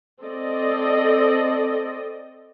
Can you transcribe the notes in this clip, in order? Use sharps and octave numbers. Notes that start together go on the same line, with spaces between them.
C4 A4 D5 D#5